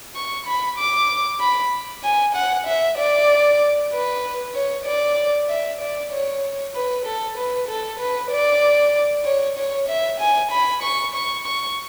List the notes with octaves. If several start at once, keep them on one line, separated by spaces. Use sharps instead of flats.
C#6
B5
D6
B5
G#5
F#5
E5
D5
B4
C#5
D5
E5
D5
C#5
B4
A4
B4
A4
B4
D5
C#5
C#5
E5
G#5
B5
C#6
C#6
C#6